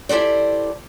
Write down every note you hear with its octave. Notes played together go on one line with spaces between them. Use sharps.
E4 G4 A4 C5 D5